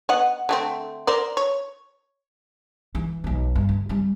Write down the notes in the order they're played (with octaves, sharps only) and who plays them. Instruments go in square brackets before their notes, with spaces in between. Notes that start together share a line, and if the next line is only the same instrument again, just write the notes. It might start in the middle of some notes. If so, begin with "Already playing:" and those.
[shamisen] B3 D#5 F#5
D3 A3 C4
A#4 C5 D5
C#5
[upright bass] E3
B1 F#3
G2
D2
G3 C4